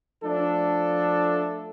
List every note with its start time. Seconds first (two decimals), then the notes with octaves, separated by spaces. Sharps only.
0.22 F3 A3 D4 A4